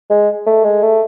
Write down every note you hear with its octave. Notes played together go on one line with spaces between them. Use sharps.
G#3
A3
G#3
A3